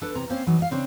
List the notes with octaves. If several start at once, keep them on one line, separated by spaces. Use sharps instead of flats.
D4 A4 B4
E2 C3 A#5
A#3 C4 C#4 C5 F5
E3 F#3 D#4
D#5 F5
C#3 C4 D4